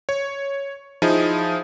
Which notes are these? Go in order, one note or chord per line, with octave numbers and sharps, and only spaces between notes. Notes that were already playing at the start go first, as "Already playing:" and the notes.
C#5
F3 D#4 E4 G#4